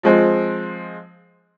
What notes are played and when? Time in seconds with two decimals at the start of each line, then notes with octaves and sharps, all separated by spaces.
0.03 F3 G#3 C4